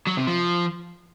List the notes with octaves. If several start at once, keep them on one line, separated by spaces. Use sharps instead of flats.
F#3
C3
F3